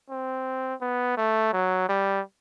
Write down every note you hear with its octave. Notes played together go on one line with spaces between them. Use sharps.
C4
B3
A3
F#3
G3